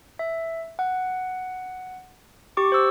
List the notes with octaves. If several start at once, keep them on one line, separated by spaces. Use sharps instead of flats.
E5
F#5
G4 C#6 D6
C5 E6